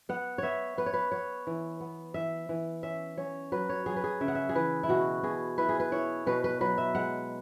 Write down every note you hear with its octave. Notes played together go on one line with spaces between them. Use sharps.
B3 F#5
B3 C#5 E5
B3 B4
C#5
B4
B3 C#5
E3
B3
E3 E5
E3
C#4 E5
C#4 C#5
F#3 B4
C#5
F#3 G#4
B4
G#4
C#3 E5
F#5
E5
G#4
E3 B4
E4
B2 F#4
B2 G#4
E4 B4
G#4
B4
E4 C#5
B2 B4
B4
F#3 B4
E5
G#3 F#5